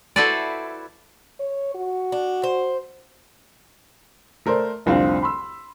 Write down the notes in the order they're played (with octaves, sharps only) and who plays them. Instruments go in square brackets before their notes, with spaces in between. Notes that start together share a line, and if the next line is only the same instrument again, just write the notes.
[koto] E4 F#4 A4 B4 C5 D5
[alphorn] C#5
F#4
[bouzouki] D4
C5
[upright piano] A3 A#4 C5 D5
F1 C2 D3 C4 F4 F5
B5 C6 E6